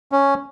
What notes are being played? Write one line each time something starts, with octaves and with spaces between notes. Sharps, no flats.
C#4